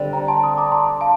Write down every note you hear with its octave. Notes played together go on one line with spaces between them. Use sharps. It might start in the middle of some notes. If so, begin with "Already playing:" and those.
Already playing: D3 G3 C4
G5 A#5
A5 C6
C6 D#6
A#5 D6
A5 C6
F5 A5